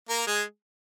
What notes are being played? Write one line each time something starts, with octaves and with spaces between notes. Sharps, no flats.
A#3 A#4
G#3 G#4